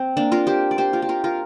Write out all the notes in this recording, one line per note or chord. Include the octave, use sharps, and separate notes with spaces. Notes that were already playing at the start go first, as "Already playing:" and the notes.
Already playing: C4
A#3 D4
F4 A#4
G4 C5
D5
G4 C5
F4 A#4
G4
F4 A#4
F4 A#4